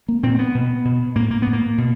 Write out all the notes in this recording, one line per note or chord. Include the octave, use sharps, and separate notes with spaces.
A#3
A#2 C4
C4
B3
B2
B2
A2 A#3
A#3
A2 B3
A#3
B2